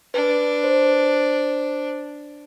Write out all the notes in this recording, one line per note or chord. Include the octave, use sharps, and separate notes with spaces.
D4 B4
C5